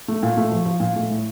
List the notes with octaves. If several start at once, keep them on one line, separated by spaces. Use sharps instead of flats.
A3
A#2
A3
F3
F3
A#2
A3
A2